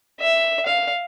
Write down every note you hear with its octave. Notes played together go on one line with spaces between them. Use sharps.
E5
F5